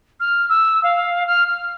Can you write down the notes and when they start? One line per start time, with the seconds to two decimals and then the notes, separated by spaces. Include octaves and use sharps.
0.20 F6
0.49 E6
0.83 F5
1.27 F6
1.47 F6